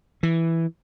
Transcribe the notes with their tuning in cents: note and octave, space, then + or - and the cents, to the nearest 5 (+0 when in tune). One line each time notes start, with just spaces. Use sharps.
E3 +0